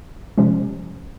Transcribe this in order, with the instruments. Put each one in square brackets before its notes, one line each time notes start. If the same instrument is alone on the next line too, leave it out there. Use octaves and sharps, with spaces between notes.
[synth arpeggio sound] C3 F3 G#3 C#4